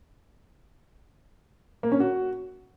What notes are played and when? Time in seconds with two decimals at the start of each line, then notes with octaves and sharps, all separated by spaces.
1.83 A#3
1.92 C#4
2.00 F#4